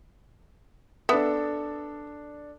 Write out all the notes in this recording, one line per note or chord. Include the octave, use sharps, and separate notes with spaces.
B3 D4 A4 E5